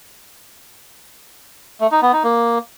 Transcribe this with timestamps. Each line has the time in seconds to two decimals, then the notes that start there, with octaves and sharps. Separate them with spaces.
1.80 A3
1.91 D#4
2.02 B3
2.13 D#4
2.24 A#3